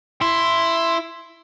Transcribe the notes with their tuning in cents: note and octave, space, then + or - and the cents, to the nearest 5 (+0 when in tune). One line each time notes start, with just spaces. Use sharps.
E4 +10 C6 +0